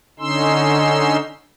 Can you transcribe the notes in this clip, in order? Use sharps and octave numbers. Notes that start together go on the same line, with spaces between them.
D3 C#4 D#4 C6 E6